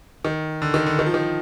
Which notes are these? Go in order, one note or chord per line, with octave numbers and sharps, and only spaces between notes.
D#3
D3
D#3
D3
D#3
F3
D#3